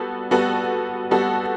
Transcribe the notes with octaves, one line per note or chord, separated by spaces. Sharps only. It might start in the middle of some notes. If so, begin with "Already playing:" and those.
Already playing: G3 B3 F#4 A4
G3 B3 F#4 A4
G3 B3 F#4 A4